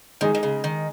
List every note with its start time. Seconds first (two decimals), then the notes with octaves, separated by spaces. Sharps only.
0.21 D#3 G#3 D#4 G#4
0.35 D#3
0.43 C#3
0.64 D#3